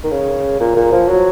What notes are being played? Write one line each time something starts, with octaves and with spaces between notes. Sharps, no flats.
D#3
C#3
A#2
A#2
F3
F#3